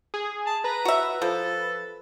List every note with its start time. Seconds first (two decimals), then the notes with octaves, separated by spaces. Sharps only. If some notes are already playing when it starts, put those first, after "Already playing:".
0.14 G#4
0.46 A5
0.64 B4 A#5
0.85 F#4 E5
1.22 F3 A4